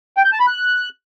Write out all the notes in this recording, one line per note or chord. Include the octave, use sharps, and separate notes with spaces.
G5
G6
A5
B5
F#6